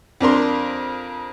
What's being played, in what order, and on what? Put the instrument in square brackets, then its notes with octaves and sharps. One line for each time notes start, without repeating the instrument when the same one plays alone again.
[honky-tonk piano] F2 D4 A#4 C6